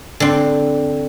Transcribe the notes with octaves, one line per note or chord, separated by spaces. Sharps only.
D3 C4